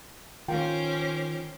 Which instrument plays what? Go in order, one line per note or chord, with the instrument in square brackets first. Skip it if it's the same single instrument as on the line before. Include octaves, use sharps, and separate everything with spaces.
[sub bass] D#3 [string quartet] C#4 C5 D6 [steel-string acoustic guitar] F4 A#4 [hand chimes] G5